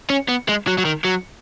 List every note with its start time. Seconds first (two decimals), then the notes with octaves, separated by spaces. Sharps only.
0.10 C#4
0.28 B3
0.48 G#3
0.67 F#3
0.78 F#3
0.85 D#3
1.05 F#3